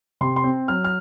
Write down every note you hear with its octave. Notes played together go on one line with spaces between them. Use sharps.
C3 C6
C6
C4
F#3 F6
F6